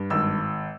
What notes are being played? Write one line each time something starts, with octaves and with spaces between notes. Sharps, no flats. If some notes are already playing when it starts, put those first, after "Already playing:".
Already playing: G2
G#1 E6